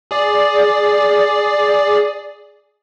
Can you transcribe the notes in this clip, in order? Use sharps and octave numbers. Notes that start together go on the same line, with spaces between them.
G#4 D5